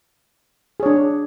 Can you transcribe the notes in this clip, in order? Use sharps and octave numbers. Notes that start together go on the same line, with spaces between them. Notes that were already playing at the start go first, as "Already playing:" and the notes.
D4 G#4 C#5